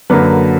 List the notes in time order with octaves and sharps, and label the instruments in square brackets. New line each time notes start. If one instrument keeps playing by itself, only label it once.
[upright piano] F#2 D3 F#3 A#3 B4